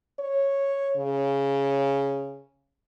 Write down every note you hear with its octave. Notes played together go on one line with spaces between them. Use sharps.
C#5
C#3